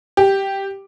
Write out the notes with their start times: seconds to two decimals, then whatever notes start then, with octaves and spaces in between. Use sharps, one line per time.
0.17 G4